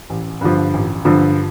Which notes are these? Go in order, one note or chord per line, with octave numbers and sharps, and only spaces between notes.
A1
G2 D3 F3
A1
G2 D3 F3